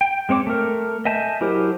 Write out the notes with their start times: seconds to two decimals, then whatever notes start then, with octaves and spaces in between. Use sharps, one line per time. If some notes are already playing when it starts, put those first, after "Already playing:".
0.01 G5
0.29 G#3 C4 C#5 D6
0.47 A3 A#4
1.05 D#5 E5 G#5 A5 G6
1.41 F#3 E4 G4 A#4 C5